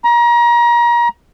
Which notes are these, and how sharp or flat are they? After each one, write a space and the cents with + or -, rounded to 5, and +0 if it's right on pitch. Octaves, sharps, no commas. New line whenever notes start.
A#5 +30